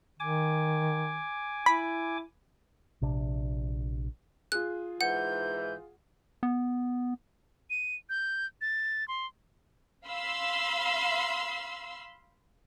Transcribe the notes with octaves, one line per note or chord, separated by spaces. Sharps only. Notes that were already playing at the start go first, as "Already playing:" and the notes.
D#3 G#5 D6
E4 B5
A#1 C3 D4
F4 G#4 F#6
G#2 E3 F#5 G6
B3
D#7
G6
A6
C6
F5 B5 C6 E6